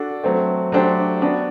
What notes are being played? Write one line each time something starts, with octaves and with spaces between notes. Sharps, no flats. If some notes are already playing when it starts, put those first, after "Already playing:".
Already playing: D4 F#4 A4
F#3 A3 C4
F#3 A3 D4 G4 C5
B3 D4 F#4 B4 D5